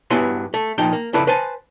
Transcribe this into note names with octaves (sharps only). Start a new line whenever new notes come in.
G2 F#3 B3 E4 G#5 C6
A3
A#2 F3 D#4 G5
A#3
F2 C#3 E4 A4 B4 D5
B4 C5 G#5 A5